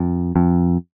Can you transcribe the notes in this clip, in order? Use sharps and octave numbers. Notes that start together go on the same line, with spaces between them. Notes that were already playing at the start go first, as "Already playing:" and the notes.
Already playing: F2
F2